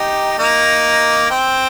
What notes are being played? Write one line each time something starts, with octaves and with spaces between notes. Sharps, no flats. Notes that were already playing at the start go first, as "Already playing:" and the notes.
Already playing: D#4 G4
A#3 D#4
C4